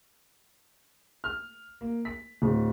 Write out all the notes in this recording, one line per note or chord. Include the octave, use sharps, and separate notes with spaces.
F6
A#3
B6
D1